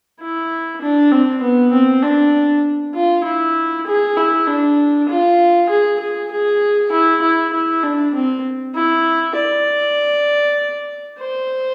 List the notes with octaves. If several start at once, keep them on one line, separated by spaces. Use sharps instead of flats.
E4
D4
C4
B3
C4
D4
F4
E4
G#4
E4
D4
F4
G#4
G#4
G#4
E4
E4
E4
D4
C4
E4
D5
C5